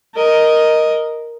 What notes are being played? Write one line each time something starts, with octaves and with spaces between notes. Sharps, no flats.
A#4 D#5